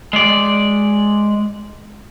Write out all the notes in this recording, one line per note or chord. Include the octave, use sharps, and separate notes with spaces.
G#3 D5